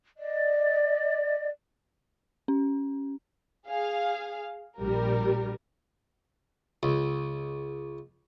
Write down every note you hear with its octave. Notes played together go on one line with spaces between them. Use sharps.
D5 D#5
C#4
G#4 F5
A#1 G3 A#4
C#2